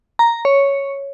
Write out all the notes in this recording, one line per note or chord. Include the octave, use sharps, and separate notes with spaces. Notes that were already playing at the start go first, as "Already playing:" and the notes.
A#5
C#5